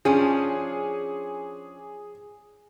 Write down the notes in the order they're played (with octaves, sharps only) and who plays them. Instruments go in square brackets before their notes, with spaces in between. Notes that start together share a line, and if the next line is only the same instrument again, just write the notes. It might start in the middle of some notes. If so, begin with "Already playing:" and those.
[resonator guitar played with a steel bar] F3 C#4 D4 [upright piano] G#4